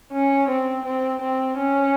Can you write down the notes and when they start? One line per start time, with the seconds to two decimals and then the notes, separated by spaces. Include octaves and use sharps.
0.13 C#4
0.49 C4
0.85 C4
1.21 C4
1.58 C#4